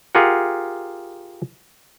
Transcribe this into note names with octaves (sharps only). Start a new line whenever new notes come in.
F4 G4 G#4 A#4 F#5